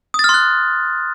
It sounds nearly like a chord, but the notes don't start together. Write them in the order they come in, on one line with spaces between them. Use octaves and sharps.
D#6 A6 F6 C6 F#6